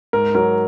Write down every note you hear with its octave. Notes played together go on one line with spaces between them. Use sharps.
G#2 A#4
F#3 A#4